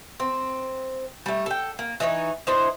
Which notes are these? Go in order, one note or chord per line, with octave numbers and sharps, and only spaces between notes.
C4
G3 A3
A4 G5
A#3
E3 D#4 E4 C#5
D4 E4 C5 D#5